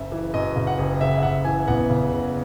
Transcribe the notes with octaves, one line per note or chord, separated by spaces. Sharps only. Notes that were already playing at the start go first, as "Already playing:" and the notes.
Already playing: F#1 C#3 E5
E3
F#2 D#5
C#3
F#5
F#1
C#3 E5
E5
F#1 F#5
E3 G#5
E2 F#5
C#3
F#1